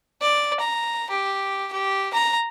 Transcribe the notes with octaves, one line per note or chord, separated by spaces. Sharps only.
D5
A#5
G4
G4
A#5